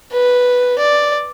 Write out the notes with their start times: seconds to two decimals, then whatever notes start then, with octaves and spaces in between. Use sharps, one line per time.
0.12 B4
0.79 D5